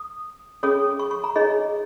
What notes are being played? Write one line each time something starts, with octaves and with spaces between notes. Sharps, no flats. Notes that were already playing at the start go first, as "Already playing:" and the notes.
Already playing: D#6
C#4 G#4 C#5 D#6
C#6
C#6
A#5
D#4 G#4 C#5 D#5